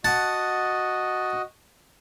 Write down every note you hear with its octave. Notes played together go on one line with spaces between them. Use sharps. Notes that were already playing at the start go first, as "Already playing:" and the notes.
F#4 D#5 F#5 A5